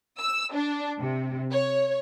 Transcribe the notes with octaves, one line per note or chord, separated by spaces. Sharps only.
E6
D4
C3
C#5